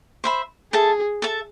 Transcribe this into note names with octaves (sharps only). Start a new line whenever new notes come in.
C5 E5 B5
G#4 A4 E5 A5
A4 E5 A5